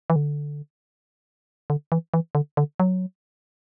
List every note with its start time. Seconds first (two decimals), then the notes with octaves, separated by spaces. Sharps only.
0.10 E3
0.16 D3
1.70 D3
1.92 E3
2.14 E3
2.35 D3
2.57 D3
2.80 F#3